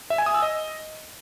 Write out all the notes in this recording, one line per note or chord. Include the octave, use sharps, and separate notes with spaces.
E5
G#5
D#6
E6
D#5